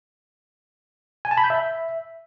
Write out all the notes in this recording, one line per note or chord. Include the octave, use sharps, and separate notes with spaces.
G#5
A5
B5
G6
E5